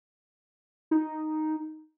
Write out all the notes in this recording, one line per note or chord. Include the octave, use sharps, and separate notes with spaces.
D#4